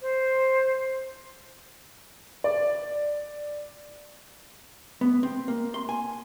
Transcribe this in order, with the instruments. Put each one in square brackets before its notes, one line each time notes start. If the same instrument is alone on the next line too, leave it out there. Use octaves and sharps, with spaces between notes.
[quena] C5
[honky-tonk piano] D5
[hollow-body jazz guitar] B3
C4
A#3
C6
G#5